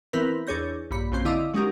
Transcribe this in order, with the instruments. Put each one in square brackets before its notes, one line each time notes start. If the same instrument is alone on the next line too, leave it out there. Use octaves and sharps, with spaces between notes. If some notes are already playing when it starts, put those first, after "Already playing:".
[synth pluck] E3 B3 C4 E4 A#4 B4
E2 D4 G#4 C#5 G6 A#6
A#1 G2 B5 C#7
A#1 F#2 C#3 C4 C7
D3 E4 D#5 F5 D6 E6
F#3 G#3 C#4 D#4 G4 A#4